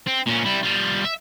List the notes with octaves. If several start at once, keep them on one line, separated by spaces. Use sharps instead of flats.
C4
A#2 C#4
G3 E4
G3 F4
E5